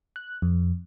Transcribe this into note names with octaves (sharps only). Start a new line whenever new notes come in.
F#6
F2